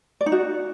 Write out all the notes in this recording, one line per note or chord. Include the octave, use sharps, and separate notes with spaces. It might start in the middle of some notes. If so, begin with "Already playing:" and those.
D5
D#4
F#4